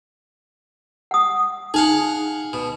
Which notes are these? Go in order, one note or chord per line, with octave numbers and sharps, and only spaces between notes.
F#5 D#6
D#4 G#4 F5 F#5
B2